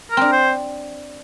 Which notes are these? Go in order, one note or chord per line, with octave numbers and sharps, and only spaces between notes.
A#4
C4 D4
C5